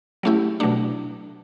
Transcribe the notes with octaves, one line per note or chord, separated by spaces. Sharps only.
F#3 A3 C#4 E4 G4
B2 F#3 A3 D4